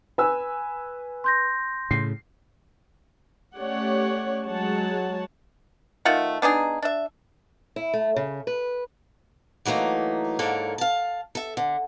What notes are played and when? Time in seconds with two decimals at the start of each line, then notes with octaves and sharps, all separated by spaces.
0.18 B4 G#5 E6
1.24 C6 G6 A#6
1.91 A2 C#3 C7
3.55 A3 C#4 G4 C#5 D5 F#5
4.46 F#3 G#3 C#5 F#5 A5
6.05 D#3 A3 F4 F#5
6.42 B3 D4 D#4 G#4
6.82 D4 E5
7.76 E4
7.93 A3
8.16 C#3
8.47 B4
9.65 E3 F#3 A3 A#3 D#4
10.39 G#2 D3 A#3 A4 A#4 C#5
10.78 F5 A5
11.35 A4 E5
11.57 D3